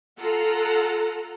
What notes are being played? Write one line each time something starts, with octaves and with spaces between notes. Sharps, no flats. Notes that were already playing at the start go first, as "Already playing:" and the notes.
F4 A4 F#5 A#5